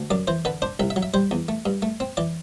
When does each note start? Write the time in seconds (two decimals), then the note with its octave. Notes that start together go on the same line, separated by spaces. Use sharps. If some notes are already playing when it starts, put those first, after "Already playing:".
Already playing: D2
0.11 F#2 D5
0.27 E3 C5
0.45 D3 B4
0.62 D4 C5
0.80 C2 E5
0.90 E5
0.96 F#3
1.03 E5
1.14 G3 C5
1.31 E2
1.49 A3
1.66 G2
1.82 A3
2.00 C4
2.17 E3 D5